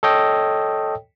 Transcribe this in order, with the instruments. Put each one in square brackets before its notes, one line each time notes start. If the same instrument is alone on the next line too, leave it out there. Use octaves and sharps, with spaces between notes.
[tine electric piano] A4 C#5 D#5 G5